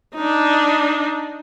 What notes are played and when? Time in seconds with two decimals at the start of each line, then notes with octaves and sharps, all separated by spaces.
0.15 D4 D#4